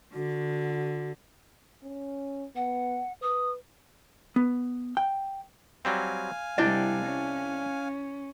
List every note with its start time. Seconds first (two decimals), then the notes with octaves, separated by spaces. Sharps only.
0.14 D3 F#4
1.83 C#4
2.55 B3 F#5
3.22 B4 D#6
4.36 B3
4.97 G5
5.85 F#3 G3 C4 F5 G#5
6.58 C2 C3 G3 D4 E4 D#5 G5
7.06 C#4